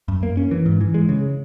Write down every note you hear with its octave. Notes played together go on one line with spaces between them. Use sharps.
F#2
A#3
C#4
E3
G#2
E3
G#3
C#3